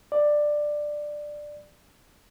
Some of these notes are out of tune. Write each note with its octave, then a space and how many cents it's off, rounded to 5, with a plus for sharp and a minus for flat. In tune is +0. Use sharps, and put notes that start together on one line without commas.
D5 +10